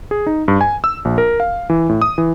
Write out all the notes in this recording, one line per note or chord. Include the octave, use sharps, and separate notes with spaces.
G#4
D#4
G2
G#5
E6
A#1
A#4
F5
E3
A2
D#6
E3